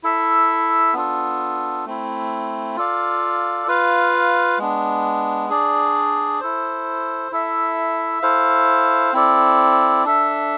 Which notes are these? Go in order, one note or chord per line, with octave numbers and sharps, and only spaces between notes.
E4 A4 E5
B3 D4 F4 A4
A3 C4 E4
F4 A4 D5 F5
F4 B4 F5
G#3 B3 D4
D4 G#4 D5
E4 A4 C5
E4 A4 E5
E4 A4 C5 F5
C4 E4 A4 D5
D4 A4 E5